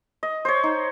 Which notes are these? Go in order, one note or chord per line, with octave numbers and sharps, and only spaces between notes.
D#5
C5 C#5
D#4